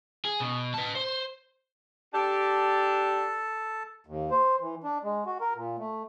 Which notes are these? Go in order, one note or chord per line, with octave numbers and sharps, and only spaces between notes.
G#4
B2
B4 A5
C5
D4 G4 A4 A5
D#2
C5
E3
D4
G#3
F#4
A#4
A#2
A3